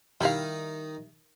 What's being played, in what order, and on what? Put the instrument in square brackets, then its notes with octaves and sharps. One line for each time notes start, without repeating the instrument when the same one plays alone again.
[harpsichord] D#3 D#4 [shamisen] G3 E4 F5